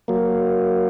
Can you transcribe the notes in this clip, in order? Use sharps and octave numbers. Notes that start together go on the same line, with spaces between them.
F#3 A#3